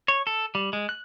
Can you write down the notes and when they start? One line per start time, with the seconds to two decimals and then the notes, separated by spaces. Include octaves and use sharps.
0.08 C#5
0.27 A4
0.55 G3
0.73 G#3
0.89 F#6